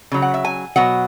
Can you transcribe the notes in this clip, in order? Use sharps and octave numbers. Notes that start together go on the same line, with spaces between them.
C#3 F#3
F#5
E5
G#5
B2 F#3 F#5